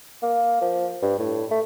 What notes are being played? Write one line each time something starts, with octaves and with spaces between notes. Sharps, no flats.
A#3
F3
G2
A2
A3